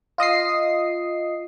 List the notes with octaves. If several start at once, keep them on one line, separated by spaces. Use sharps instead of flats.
F4 D#5 D#6 C7